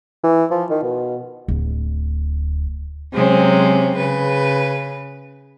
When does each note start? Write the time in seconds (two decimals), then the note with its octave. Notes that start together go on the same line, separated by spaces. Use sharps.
0.24 E3
0.51 F3
0.70 D#3
0.83 B2
1.48 D1
3.13 C3 F#3 G#3 C4 C#4
3.96 C#3 B4